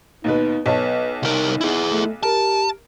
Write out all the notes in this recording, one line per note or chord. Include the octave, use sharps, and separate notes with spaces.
D#2 B2 D#4 B4
B1 B4 C#5 A5
C2 D#4 A#4
E4 G#4
A3
G4 A#4 A5